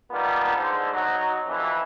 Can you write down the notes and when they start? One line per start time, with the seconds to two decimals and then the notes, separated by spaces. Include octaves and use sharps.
0.11 G3 A#3 B3 D4 D#4 F4
0.57 G#2 D3 C5
0.94 F#3 D#4
1.48 F2 E3